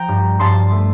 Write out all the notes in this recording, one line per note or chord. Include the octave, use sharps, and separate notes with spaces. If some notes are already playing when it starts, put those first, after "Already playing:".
Already playing: F3 G5 A#5
G2
G2 A5 C6
A3